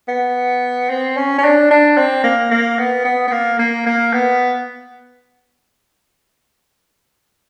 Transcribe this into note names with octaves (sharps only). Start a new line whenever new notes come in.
B3
C4
C#4
C#4
D4
D4
C4
A#3
A#3
B3
B3
B3
A#3
A#3
A#3
B3